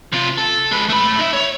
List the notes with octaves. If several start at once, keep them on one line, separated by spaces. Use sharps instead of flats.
C3 F4
A4
G#3 B4
A3 B5
D#4 E5
C#5